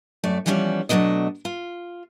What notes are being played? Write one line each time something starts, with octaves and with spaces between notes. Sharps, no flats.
F#2 A3 D5
E3 F3 G3 B3 C#4 D5
B2 F#3 A3 D4 D#5
F4